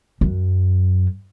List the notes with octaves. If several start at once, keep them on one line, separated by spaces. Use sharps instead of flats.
F#2